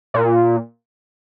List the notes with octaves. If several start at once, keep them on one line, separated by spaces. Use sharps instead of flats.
A#2